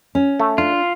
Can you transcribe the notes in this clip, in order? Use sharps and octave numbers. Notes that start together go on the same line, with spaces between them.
C#4
A3
D4 F4